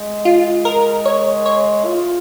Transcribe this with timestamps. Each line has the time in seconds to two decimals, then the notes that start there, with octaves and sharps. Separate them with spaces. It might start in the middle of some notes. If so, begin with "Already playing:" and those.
Already playing: G#3
0.25 F4
0.65 A#4
1.06 C#5
1.46 C#5
1.86 F4